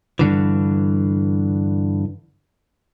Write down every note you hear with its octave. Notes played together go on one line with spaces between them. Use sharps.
G2 D3 E3